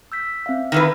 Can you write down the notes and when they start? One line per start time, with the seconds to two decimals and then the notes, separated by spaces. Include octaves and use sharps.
0.12 E6 G6 B6
0.46 C4 E5 F5
0.72 D#3 E3 B4